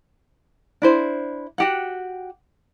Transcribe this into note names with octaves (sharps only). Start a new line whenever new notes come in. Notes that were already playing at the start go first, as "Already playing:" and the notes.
D4 E4 C5
F#4 G4 F#5